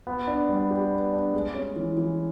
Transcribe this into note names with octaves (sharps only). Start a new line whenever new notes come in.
B3
D4
G3
G4
B3
D4
G#3
C#4
E3
E3